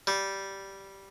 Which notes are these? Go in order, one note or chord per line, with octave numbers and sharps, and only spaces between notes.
G3